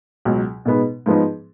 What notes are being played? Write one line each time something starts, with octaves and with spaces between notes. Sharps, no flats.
C#2 B2 F#3
B2 G#3 B3 D#4
G#2 F3 B3 D#4